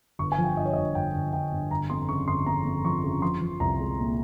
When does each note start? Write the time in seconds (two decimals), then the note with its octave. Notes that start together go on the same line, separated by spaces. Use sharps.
0.19 G1 C#6
0.32 G#5
0.38 F3
0.44 G5
0.57 G2 D#5
0.66 C#5
0.73 D#5
0.76 G2
0.95 G1 G5
1.14 G1
1.33 G1 G5
1.52 G2
1.70 G1 A#5
1.90 F2 C6
2.09 C#3 C#6
2.28 G1 C6
2.46 F2 A#5
2.65 F2
2.84 F3 C#6
3.04 C#3
3.22 F3 C6
3.41 F3
3.60 C2 A#5
3.79 G#3
3.98 A#2